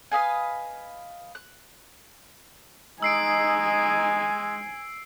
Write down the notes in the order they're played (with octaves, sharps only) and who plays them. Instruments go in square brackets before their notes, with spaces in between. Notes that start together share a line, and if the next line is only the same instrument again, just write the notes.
[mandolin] B4 D#5 F5 G#5
F#6
[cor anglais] G#3 [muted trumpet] D#4 [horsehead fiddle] G#5 [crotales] E6 C7 D7